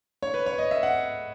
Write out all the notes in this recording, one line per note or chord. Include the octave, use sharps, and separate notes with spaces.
C#5
B4
C#5
D#5
E5
F#5